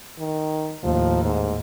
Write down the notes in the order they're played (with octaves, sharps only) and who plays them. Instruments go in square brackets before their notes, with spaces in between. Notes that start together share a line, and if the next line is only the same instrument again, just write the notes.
[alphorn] D#3
[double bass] D#2 A2 [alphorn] F3
[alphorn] G#2